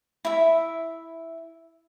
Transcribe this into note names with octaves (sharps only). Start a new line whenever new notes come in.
E4 E5